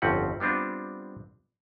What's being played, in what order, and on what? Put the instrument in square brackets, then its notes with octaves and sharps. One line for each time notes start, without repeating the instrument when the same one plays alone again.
[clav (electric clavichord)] G1 F2 C4 C#4 F#5
G3 B3 C4 D4 F4